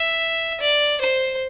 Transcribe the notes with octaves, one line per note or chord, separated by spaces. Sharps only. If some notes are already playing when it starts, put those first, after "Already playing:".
Already playing: E5
D5
C5